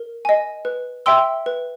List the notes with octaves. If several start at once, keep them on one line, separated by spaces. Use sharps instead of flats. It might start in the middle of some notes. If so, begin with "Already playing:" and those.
Already playing: A#4
D#5 G#5
B4
E5 G5 C6 E6
B4